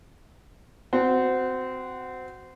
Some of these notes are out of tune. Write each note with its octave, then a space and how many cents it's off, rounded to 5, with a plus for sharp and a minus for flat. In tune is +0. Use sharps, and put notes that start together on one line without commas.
C4 -20 F#4 +0